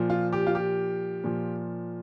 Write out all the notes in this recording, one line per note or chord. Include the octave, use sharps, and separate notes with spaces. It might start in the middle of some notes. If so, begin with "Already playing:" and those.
Already playing: A#2 F3
F4
G4
F4
G4
A#2 F3